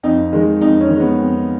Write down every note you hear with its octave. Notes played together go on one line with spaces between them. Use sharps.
F2 D#4
D#3 G#3
F2 D#4
C#4
D#3 G#3
B3
F2